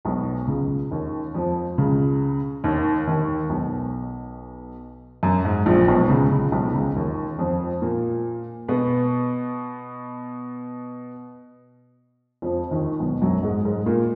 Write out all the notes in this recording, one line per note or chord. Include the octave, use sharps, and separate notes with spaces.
B1 B2
C#2 C#3
D#2 D#3
F2 F3
C#2 C#3
D#2 D#3
D#2 D#3
B1 B2
F#2
G#2
A#1 A#2
B1 B2
C#2 C#3
C#2 C#3
B1 B2
C#2 C#3
D#2 D#3
F2 F3
A#2 A#3
B2 B3
F2 F3
D#2 D#3
B1 B2
F#2 F#3
G#2 G#3
G#2 G#3
A#2 A#3